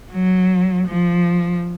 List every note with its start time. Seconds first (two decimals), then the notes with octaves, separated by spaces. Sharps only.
0.12 F#3
0.87 F3